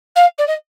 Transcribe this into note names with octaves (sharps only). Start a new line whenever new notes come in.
F5
D5
D#5